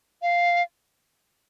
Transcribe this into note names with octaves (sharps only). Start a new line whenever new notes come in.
F5